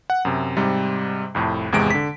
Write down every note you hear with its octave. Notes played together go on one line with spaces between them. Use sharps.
F#5
F#2 C3
G#2 C3 G3
C2 F2 A2
G#1 E2 C3 G#3 D7
D3 B6